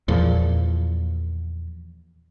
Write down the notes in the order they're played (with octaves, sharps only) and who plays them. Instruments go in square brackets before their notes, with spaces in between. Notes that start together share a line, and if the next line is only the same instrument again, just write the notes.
[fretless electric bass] E2 A#2 F3